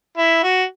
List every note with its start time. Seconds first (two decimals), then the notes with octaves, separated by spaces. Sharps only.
0.17 E4
0.43 F#4